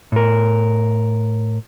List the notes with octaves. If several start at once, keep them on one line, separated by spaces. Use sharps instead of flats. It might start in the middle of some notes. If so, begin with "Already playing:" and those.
A2 A#4